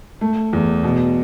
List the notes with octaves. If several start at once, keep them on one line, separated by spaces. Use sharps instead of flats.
A3
E2
B2